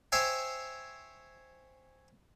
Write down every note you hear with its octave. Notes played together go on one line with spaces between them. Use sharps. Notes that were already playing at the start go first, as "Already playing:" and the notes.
C5 C#5 E5 G5 G#5